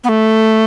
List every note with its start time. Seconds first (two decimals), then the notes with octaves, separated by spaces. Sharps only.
0.04 B3
0.09 A3